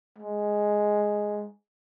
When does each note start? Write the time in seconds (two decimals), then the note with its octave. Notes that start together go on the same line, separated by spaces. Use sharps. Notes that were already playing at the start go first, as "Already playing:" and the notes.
0.18 G#3